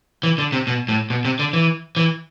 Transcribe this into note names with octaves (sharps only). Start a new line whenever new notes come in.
E3
D3
C3
B2
A2
B2
C3
D3
E3
E3